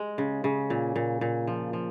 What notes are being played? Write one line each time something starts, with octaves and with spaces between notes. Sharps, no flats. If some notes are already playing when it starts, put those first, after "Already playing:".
Already playing: G#3
C#3
C#3
A#2
A#2
A#2
F3
F3